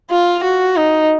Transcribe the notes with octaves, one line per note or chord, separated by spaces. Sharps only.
F4
F#4
D#4